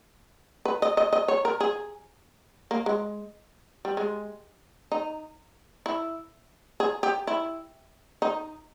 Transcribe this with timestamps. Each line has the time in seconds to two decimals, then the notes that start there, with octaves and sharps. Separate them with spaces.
0.65 B4
0.82 D#5
0.97 D#5
1.13 D#5
1.28 C#5
1.45 A#4
1.60 G#4
2.71 A#3
2.86 G#3
3.85 G3
3.97 G#3
4.92 D#4
5.86 E4
6.80 G#4
7.03 G4
7.27 E4
8.22 D#4